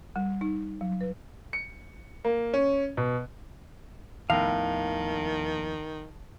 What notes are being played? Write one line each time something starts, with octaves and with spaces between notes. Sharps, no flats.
G3
D#4
F#3
B4
C#7
A#3
C#4
B2
D#2 A2 D#3 F3 B3 F5